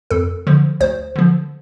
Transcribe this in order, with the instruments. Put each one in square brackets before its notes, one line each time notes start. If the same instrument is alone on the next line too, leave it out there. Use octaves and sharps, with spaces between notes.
[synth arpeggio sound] F2 A4
D3 F3
D2 C5
D3 F3